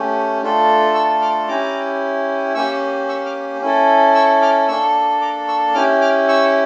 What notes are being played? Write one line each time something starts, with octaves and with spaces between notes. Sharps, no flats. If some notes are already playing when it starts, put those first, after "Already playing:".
Already playing: A3 C#4 G4
A3 D4 F4 A4
C#6 E6
D6 F6
C#4 E4 G4 A#5 D6
A#3 C#4 G4 C#6 E6
C#6 E6
D6 F6
C#4 E4 A4
C#6 E6
D6 F6
A#3 D4 A4 C#6 E6
A#5 D6
C#6 E6
C#4 E4 G4 D6 F6
D6 F6
C#6 E6